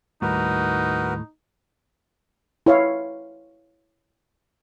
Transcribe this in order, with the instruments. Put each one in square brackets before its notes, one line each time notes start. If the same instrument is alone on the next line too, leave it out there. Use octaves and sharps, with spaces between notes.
[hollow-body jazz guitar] D#2 G3 [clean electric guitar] A2 [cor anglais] D#4 [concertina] F#4 A#4 B4
[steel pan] E4 C#5 F5